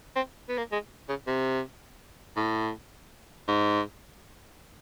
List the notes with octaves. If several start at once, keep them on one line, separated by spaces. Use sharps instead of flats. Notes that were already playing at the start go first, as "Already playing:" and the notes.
C4
B3
A#3
G#3
C#3
C3
A2
G#2